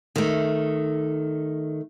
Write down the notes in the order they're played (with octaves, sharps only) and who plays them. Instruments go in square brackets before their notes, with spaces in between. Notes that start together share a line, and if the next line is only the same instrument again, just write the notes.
[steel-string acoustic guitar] D#3 A3